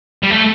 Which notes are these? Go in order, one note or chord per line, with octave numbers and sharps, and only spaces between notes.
G3
A3